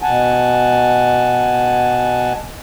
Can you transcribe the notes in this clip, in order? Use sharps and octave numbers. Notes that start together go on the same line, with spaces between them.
B2 F#5 G#5 A5